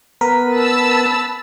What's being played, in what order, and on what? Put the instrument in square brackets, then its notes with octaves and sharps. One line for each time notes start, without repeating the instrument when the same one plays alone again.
[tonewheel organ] B3 B4 [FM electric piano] A#4
[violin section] A5 B5 E6